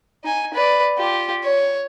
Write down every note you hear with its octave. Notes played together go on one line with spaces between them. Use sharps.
D#4 G#5
B4 D5
F4 G4
C#5